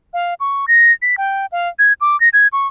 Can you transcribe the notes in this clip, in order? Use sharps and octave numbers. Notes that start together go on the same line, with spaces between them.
F5
C#6
A#6
B6
G5
F5
G#6
D6
A#6
G#6
C#6